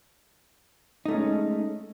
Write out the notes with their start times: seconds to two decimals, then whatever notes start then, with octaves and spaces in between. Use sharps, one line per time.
1.06 D#4
1.08 A3
1.11 C#4
1.14 G#3